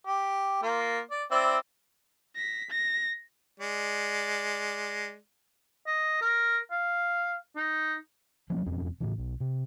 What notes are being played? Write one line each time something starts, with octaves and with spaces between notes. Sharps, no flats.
G4
A#3 F4
D5
C4 E4 D5
A#6 B6
A#6
G#3 D5
D#5
A#4
F5
D#4
F3 F#3 A#3 C#4
E1 F2 C4 C#4
A2 C#3 E3
B1
C3